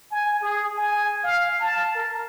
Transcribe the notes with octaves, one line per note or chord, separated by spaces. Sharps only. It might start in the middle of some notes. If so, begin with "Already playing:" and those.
G#5
G#4
G#5
F5
A5
A#4